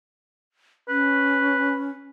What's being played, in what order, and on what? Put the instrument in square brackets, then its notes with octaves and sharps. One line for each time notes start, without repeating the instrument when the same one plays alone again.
[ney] C#4 [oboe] B4